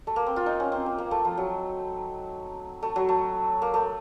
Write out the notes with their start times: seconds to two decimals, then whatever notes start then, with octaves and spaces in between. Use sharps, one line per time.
0.07 A3
0.16 A#3
0.26 C4
0.36 F4
0.46 D#4
0.60 C#4
0.72 C4
0.86 A#3
0.98 A#3
1.11 A3
1.25 F3
1.37 F#3
2.83 A3
2.96 F#3
3.09 A3
3.62 A#3
3.74 A3